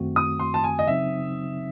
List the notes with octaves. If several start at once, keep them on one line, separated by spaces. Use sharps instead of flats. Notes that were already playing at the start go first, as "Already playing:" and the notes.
Already playing: F#2 D#3 A3 C4 F#4
D#6
C6
A5
G#5
D#5
C#3 F#3 C4 D#4 E5